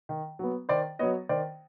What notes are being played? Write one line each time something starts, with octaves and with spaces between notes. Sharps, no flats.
D#3
F#3 B3
D#3 C5 D5
F#3 B3 C#5 D#5
D#3 C5 D5